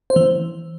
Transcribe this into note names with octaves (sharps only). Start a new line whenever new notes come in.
C5
E3